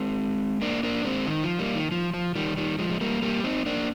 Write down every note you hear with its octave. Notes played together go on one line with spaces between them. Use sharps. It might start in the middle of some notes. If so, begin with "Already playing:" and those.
Already playing: G#3 C4
A#3 D4
A#3 D4
G#3 C4
D#3
F3
G3 A#3
D#3
F3
F3
D#3 G3
D#3 G3
F3 G#3
G#3
G3 A#3
G3 A#3
C4 D#4
A#3 D4